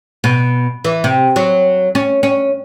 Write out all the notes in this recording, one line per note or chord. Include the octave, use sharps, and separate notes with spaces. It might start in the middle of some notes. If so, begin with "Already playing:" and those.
B2
E3
C3
F#3
C#4
C#4